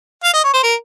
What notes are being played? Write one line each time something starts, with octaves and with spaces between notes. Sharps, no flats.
F5
D#5
C#5
C5
A#4